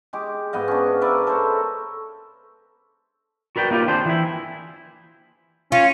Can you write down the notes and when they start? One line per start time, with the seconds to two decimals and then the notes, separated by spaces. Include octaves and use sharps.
0.13 G#3 G4 D6
0.53 G#2 B3 D#5 F5
0.68 C#4 D4
1.01 A#4 B4 D5 E5
1.27 A4 A#4 C5 C#5
3.56 F#4 A#4 B4 D5 G5
3.71 A#3 D#4 F4 G4 B4
3.88 D#3 C4 D4 G#4 C5 G5
4.06 E3 E4
5.72 C#4 F4